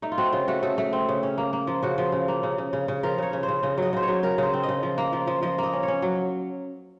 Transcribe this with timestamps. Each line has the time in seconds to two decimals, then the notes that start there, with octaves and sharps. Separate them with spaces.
0.02 A3 D#4
0.12 F4
0.18 C4 F#4
0.32 C#3 F4
0.48 A3 F#4
0.63 C#3 A4
0.78 A3
0.93 C4
1.09 C#3
1.23 C#4
1.38 A#3
1.53 A#3
1.67 F3
1.83 C#3 F#4
1.98 F3
2.12 C#3
2.28 A#3
2.43 C#3
2.58 C#3
2.73 C#3
2.88 C#3
3.03 F3 A#4
3.18 C#3 C#5
3.33 C#3
3.43 C5
3.48 C#3
3.63 C#3 D#5
3.78 F#3 D#5
3.93 C#3 C5
4.03 C#5
4.08 F#3
4.23 C#3 A#4
4.38 C#3 C5
4.53 C4
4.63 D#5
4.69 C#3
4.83 F3
4.98 A#3
5.13 F3
5.27 F3
5.43 F3 D#5
5.58 A#3 D#5
5.73 C#4
5.83 C#5
5.88 C#4
6.02 F#3